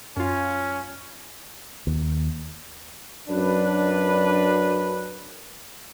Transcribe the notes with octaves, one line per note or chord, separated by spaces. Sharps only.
F#2 C#4 F4
D#2
F#2 D4 B4